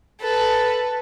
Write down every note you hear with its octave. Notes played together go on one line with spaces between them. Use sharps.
A4 B4